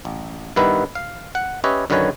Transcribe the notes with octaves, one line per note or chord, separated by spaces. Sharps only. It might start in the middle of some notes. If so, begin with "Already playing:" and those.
A1
G2 D#3 B3 E4 B4
F5
F#5
C#4 G4 B4 C#5 D#5 E5
F#2 D3 D#3 B4 C#5 G#5